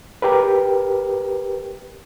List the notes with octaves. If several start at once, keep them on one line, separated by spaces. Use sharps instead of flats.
G4 A#4 B4